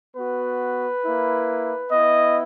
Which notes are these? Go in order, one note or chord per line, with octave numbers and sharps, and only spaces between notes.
B3 F#4 B4
A#3 E4
B3 E4 D#5